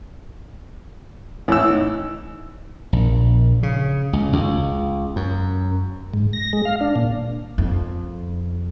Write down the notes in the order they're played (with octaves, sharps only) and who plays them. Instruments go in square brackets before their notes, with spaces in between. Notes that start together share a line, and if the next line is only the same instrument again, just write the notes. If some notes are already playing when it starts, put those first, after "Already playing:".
[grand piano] A1 E6 [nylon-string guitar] E4 E5
[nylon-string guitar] D#4
[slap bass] A#1
C#3
C#2
C#2
F#2
[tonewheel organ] G#2
A#6
G#3
F5
D4
A#2
[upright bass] F2